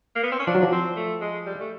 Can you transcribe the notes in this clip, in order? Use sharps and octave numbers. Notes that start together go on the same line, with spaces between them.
A#3
B3
C4
C#4
F3 D4
F#3
F3
C4
A3
G#3
G3
A3